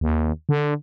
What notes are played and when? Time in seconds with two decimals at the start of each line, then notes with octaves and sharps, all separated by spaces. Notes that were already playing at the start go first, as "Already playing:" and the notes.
0.01 D#2
0.49 D3